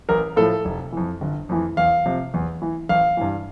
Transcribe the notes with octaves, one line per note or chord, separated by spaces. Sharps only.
A1 A#4
A2 F3 A4
F1
F2 E3
G1
F2 E3
E2 F5
C3 F3
E2
E3
A1 F5
G2 E3